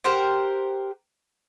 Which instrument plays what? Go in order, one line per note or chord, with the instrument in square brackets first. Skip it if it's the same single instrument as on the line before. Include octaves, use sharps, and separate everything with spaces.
[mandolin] G4 A#4 C5 F#5